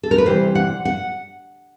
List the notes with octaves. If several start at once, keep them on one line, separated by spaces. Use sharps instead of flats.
A4
A#4
B4
C3 E3 G3 C5
F#5
F#5